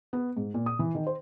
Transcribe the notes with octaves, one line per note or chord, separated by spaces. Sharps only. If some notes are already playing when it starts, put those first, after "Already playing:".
B3
G#2
A#2
D#6
E3
D#3
C5